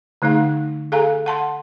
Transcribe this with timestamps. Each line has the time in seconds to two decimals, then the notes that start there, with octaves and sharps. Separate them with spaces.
0.22 D3 A3 D#4 G#4 F5
0.92 G#4 A4 F5 G#5 A#5
1.26 F#5 A5 C6